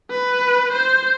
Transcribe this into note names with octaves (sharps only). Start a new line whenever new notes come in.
B4
C5